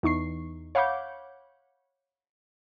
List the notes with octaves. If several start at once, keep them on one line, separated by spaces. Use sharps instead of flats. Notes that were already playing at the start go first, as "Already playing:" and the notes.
E2 D#4 C#6 C7
C#5 F5 F#5 B5 D6 G6